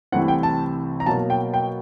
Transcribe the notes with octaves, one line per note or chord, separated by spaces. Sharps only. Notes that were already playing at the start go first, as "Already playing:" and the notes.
C2 C3 E3 A3 C4 F#5
G5
A5
A#5
B2 F#3 A#3 A5
G5
G5